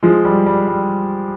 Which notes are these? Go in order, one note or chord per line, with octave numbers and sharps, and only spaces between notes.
F3 G#3
G3
G3
G3